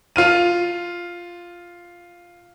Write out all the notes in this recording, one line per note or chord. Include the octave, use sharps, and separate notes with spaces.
F4 F6 D#7